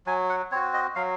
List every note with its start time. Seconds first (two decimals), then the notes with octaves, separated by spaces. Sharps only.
0.06 F#3 G#5
0.29 F#5
0.51 C4 C#5
0.55 F#4
0.74 D#5
0.96 F#3 F5